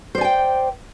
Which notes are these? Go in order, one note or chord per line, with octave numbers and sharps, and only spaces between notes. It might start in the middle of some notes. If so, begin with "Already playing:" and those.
C5 D5 G5 G#5